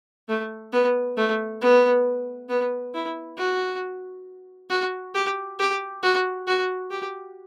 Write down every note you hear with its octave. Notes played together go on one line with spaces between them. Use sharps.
A3
B3
A3
B3
B3
E4
F#4
F#4
G4
G4
F#4
F#4
G4